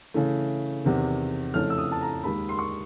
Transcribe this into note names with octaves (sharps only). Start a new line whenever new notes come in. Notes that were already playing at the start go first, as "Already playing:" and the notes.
C#3 E3 A3
E2 C3 D#3
F2 C#3 E3 A3 C#4 F6
E6
D#6
A5
A#5
D#2 D#3 G#3 B5
C6
C#6